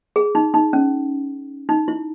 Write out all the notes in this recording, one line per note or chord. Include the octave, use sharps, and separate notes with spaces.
G#4
D#4
D#4
C#4
D#4
E4